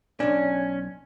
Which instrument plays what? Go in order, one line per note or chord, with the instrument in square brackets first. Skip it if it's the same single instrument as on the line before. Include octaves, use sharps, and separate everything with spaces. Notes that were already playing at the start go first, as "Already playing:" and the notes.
[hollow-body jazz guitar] B1 D4 [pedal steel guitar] C#4